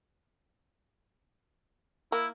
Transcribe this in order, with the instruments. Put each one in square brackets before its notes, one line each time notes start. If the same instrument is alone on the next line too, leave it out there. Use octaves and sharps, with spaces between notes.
[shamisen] A#3 [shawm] E4